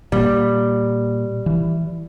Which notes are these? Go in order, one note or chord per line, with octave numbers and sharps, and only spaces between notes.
A#2 G3 A#3
E3